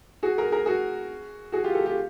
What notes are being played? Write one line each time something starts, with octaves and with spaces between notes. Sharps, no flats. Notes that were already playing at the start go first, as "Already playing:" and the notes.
F#4 G#4
G#4 A#4
G#4 A#4
F#4 G#4
F#4 G#4
F4 G4
G4 A4
F4 G4